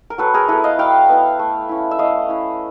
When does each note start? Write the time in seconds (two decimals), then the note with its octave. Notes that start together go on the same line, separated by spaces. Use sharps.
0.10 A#4
0.18 F#3 A4 B4
0.34 G#4 A#4
0.48 B3 E4 A4 B4
0.64 D#5 F5
0.78 F#3 F5 G5
1.09 B3 E4
1.39 A3
1.69 C#4 E4
1.91 E5
1.99 A3 D#5 F5
2.29 C#4 E4